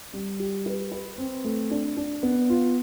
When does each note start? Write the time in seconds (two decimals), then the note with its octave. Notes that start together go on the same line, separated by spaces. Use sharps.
0.13 G3
0.40 G4
0.66 B4
0.92 B4
1.18 C4
1.44 A3
1.71 D4
1.97 D4
2.23 B3
2.50 F4